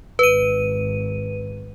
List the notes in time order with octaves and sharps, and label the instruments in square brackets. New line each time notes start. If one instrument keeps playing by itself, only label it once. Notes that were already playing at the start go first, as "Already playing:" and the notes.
[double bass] G#1 [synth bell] B4 D#7